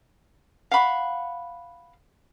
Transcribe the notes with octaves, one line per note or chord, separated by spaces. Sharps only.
F5 F#5 B5 C#6